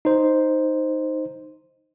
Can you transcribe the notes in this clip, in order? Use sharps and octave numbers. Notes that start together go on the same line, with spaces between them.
D#4 C5